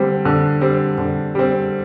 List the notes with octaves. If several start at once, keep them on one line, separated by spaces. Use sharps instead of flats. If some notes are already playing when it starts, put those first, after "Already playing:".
Already playing: D3 G3 C4
D3
G3 C4
D3
G3 C4